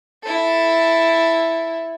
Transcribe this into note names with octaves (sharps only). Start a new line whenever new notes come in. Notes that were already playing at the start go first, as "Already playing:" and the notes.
E4 A4